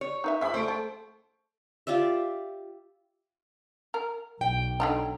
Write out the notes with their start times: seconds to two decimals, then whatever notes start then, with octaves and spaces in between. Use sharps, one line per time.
0.01 C#5
0.24 D#4 B4 E5
0.41 F3 G#3 E5 B5
0.54 A3 C5 C#6 D7
0.68 A4
1.87 F4 G4 D5 E5
3.94 A#4
4.41 B1 G5
4.80 D3 F#3 D#4